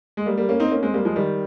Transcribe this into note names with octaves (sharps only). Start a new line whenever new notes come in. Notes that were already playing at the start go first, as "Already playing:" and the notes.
G#3
G3 A#3
G3 A#3
A#3 C#4
C4 D#4
A#3 C#4
G#3 C4
G3 A#3
F3 G#3
D#3 G3